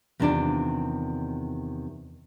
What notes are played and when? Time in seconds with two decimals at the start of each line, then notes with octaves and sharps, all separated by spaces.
0.20 E2 C3 D#3 D4 F4 D5